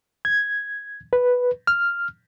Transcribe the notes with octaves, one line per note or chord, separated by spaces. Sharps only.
G#6
B4
F6